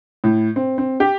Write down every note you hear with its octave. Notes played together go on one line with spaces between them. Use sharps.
A2
C4
C4
G4